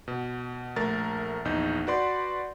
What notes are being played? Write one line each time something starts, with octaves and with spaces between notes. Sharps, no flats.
B2
A#1 A3 A#4 A6
A#1 E2 D#4 G6
F#4 B4 D5 C6